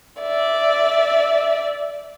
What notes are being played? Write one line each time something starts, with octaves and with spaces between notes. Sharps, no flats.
D5 E5